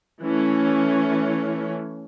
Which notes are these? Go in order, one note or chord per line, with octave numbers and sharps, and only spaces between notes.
E3 A3 C#4